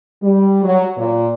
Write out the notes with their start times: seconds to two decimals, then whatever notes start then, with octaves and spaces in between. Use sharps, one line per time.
0.23 G3
0.63 F#3
0.96 A#2